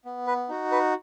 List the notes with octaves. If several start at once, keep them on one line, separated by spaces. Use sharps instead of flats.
B3
B4
D#4 F#4
B4